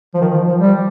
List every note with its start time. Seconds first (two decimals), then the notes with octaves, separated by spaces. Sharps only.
0.14 F3
0.21 D#3
0.34 F3
0.48 F3
0.61 G3